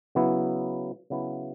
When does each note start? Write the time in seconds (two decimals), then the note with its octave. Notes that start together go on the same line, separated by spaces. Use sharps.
0.15 C#3 F#3 B3 E4
1.10 C#3 F#3 B3 E4